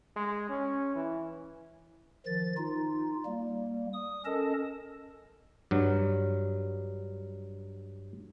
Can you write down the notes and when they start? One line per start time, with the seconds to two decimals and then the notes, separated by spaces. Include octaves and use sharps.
0.16 G#3
0.49 C#4
0.95 E3
2.26 D#3 F3 A6
2.57 D#4 F4
3.26 G3 A#3
3.93 D#6
4.25 C#4 A4 A#4 D#5 A5
5.71 G2 F#3